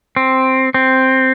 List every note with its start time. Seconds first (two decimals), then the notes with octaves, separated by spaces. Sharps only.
0.16 C4
0.74 C4